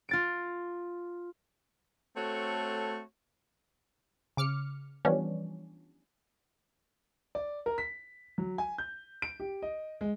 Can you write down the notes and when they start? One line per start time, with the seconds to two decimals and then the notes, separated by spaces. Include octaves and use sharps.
0.09 F4 A6 D7
2.16 A3 C4 F#4 A4 C#5
4.37 C#3 D6 F6 C#7
5.05 E3 F3 G3 B3 C#4 D4
7.35 D5
7.66 A#4
7.78 B6
8.38 F#3
8.58 G#5
8.78 G6
9.22 D7
9.40 G4
9.62 D#5
10.01 G#3